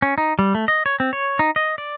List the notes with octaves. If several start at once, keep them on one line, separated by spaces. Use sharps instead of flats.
C#4
D#4
G3
A3
D#5
C#5
C4
C#5
D#4
D#5
D5